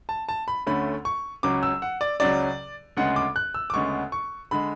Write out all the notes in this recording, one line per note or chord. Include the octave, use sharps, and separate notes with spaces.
A5
A5
B5
D2 D3 A3 C#4 B5
C#6
C#2 C#3 F#3 C#4 D6
E6
F#5
D5
C#2 C#3 F#3 C#4 D5
D2 C#3 G#3 B3 F#5
D6
F#6
E6
D6
D2 C#3 G#3 B3 C#6
C#6
D3 G#3 B5